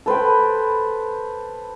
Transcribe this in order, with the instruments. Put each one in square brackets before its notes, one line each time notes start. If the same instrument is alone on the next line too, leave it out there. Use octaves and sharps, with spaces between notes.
[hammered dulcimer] A4 B4 C5 G5